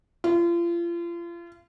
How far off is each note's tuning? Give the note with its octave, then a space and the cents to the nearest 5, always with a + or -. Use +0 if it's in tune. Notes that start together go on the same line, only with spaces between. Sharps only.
F4 -35